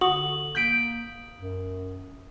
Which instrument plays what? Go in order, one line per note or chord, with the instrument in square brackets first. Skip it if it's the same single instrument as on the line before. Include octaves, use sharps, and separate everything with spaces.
[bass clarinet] D3 [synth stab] F#4 [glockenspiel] D#6 F#7
[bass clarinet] A#3 [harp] G6 B6 D7
[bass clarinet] F#2